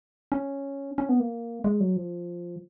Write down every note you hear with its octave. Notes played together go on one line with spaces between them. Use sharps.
C#4
C#4
B3
A#3
G#3
F#3
F3